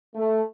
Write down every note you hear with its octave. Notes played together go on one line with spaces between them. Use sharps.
A3